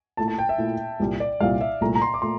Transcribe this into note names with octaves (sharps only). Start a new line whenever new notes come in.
A#2 A3 E4 A5
A5
G5
E5
A#2 A3 E4
C2 A#2 G3
D5
C2 A#2 G3 F5
E5
C2 A#2 A3 A#5
A#5
C6
D6
A#2 A3 C6